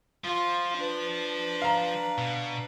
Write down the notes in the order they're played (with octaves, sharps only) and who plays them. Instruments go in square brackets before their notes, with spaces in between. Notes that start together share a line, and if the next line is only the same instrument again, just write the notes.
[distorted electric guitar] F3 [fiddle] F4
[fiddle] D4 B4
[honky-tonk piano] F5 A#5
[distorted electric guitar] B2